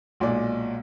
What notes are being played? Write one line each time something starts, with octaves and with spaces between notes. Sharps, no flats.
B1 A#2 G#3 D5